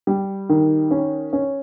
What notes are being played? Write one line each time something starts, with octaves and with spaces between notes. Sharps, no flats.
G3
D#3
C#4
C#4